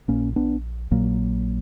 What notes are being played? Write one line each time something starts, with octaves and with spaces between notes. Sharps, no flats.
A#1 A#2 A#3 C#4
B3 D4
A#1 A#2 F#3 A#3